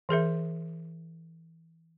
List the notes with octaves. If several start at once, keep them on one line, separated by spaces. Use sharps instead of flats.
E3 G#4 A#4 E5